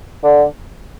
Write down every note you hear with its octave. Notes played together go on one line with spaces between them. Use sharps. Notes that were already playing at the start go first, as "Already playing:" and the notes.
D3